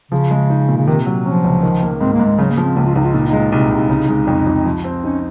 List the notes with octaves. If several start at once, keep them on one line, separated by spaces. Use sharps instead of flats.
C#3 F3
G#3
D#4
A#2
C#3
C3 D#3
F#3
F3 C#4
C#2
D#3
A#3
G#2 C4
A#3
G#2
G#3
C#3 F#3
A#3
F3
C4
C#2 A#3
F4
C#2 D#4
F4
A#2 D#4
D#4
G#3
D#4
C2 D#4
C2
C#3
G#3
F2
F2
F3
C4
C#4 D#4